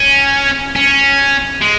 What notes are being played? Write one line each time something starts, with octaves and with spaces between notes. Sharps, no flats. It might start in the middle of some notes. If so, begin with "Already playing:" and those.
Already playing: C#4
C#4
G#3